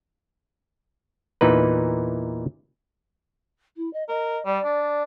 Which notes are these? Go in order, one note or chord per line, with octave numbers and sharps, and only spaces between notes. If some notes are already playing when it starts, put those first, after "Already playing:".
E2 A#2 E3 D#4 B4
E4
D#5
A#4 D#5
G3 D5
D4